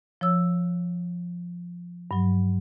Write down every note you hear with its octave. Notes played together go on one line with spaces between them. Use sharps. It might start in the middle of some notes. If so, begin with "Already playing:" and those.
F3 C#5 E6
G2 F#3